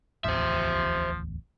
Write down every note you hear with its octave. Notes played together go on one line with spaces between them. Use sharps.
D1 A1 E2 F3 C5 E5